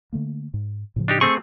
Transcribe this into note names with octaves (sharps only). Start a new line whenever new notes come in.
D3 A3 A#3
G#2
A2 C#3 F3
D4 D#4 G4
A3 C4 G#4 C#6